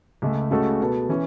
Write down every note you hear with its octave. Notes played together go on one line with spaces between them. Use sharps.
C#2 C#3 A3
C#2 C#3 A3 F#4 A4
B2 B3 A4
E3 C#4